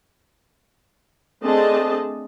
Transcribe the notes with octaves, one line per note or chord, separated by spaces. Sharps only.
A3 C4 D4 G#4 D#5 A5